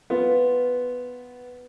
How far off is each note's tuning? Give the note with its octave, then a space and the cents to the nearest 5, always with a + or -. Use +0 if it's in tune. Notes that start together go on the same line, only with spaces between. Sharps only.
B3 +5 F4 +0